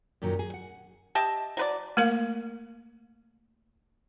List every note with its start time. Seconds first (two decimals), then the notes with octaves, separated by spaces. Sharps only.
0.22 F#2 A#2 D#3 F#3
0.39 G#4
0.54 F#5
1.15 G4 D#5 E5 A5
1.57 F#3 B4 D5
1.97 A3 A#3 A#4 F5